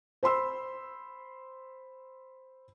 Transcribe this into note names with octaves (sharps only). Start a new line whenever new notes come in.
C5 B5 C6 E6